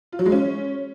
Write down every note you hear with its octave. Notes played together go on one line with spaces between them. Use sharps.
F4
F#3
G#3
C#4